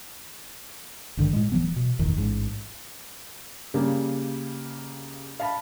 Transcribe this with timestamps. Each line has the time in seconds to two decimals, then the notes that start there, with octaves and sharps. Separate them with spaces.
1.17 G#1 G2 D3 D#3
1.33 A2 G#3
1.52 D1 E3 F#3 B3
1.76 B2
1.99 F#1 E2 A2 D#3
2.17 A1 G#2
3.74 C#3 G3 A#3
5.40 F5 A5 B5